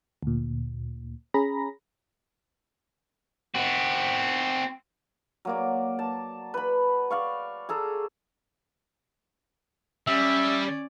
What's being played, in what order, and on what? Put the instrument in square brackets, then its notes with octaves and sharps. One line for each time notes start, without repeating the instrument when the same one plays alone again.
[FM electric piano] D2 A#2
C#4 G#4 A#5 B5 A#6
[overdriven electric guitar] C4 F#4
[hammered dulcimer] F#3 A#3 D5
A5
B4 B5
D5 F5 C#6
G#4 A4 A#5
[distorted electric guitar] G3 [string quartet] C#4 D5 [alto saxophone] E5